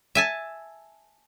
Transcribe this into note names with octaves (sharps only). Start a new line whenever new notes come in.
E5 G#5 A5